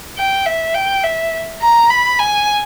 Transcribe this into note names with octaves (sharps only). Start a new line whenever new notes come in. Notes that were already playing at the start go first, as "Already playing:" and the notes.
G5
E5
G5
E5
A#5
B5
G#5